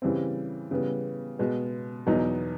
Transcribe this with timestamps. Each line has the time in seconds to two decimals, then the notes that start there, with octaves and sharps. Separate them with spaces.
0.02 C#3 E3 G3 C4
0.71 C#3 E3 G3 B3
1.39 B2 G#3 B3
2.06 E2 B2 F#3 B3 D#4